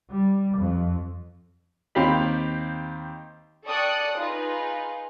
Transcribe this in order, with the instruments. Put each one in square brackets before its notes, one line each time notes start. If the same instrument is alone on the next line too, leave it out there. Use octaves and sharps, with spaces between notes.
[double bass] G3
F2
[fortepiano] D#2 C4 G4 F5 B5
[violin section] A4 D5 G5 C#6 D#6 F#6
D#4 F4 G#4 B4